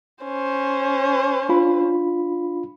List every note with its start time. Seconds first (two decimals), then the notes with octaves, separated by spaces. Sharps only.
0.24 C#4 C5
1.49 D4 F4 B5